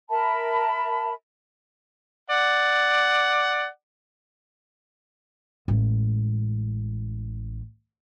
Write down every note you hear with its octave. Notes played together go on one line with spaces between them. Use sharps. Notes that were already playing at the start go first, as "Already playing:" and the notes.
A#4 E5 A5 B5
D5 F#5
A1 G#3